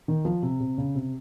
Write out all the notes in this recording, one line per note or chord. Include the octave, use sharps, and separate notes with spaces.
D#3
F3
C3
C3
C#3
C3